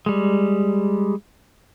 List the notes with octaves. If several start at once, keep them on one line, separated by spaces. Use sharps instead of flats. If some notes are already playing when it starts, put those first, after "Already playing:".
G3 G#3